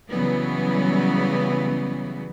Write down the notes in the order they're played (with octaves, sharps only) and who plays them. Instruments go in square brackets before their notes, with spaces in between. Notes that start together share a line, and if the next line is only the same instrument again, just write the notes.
[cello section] C#3 E3 F#3 G3 B3